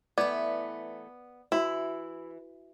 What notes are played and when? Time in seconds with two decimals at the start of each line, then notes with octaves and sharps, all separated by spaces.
0.18 E3 A3 B3 D5 D6
1.52 E3 E4 F#4